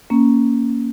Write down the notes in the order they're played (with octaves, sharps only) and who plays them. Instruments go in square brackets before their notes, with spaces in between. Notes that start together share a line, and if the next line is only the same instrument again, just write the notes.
[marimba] A#3 C#4